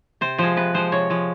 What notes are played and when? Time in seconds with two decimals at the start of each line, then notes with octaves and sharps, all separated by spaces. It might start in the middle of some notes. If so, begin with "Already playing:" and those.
0.21 C3 C5
0.38 F3 G#3 C5
0.57 C3 B4
0.74 F3 G#3 C5
0.92 C3 C#5
1.10 F3 G#3